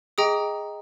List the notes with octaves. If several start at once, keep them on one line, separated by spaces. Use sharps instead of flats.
G#4 D#5 G5 A#5 D#6